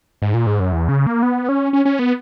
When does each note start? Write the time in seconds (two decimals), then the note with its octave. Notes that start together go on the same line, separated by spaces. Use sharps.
0.22 G#2
0.34 A#2
0.46 G#2
0.60 F#2
0.72 E2
0.89 C#3
1.07 A#3
1.23 B3
1.49 C#4
1.73 C#4
1.85 C#4
1.99 B3